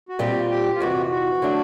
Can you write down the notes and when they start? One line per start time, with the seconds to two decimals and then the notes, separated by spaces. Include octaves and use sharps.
0.09 F#4
0.19 A#2 G3 C4 F4 G4
0.50 G4
0.75 F4
0.80 F2 C3 E3 F#4
1.11 F#4
1.42 D3 F#3 A3 D4